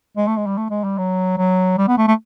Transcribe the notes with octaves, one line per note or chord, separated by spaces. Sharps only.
G#3
A3
G#3
G3
A3
G#3
G3
F#3
F#3
G3
B3
A3
A3